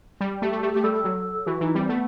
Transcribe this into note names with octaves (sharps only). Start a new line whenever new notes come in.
G3
A3 G4
A3
A3 G4
A3 G4
G3 A4
A4
F#3
E3 F#4
E3 D#4
G3 C4
A3 B3